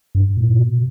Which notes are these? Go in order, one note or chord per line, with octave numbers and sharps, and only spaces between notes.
G2
A#2
B2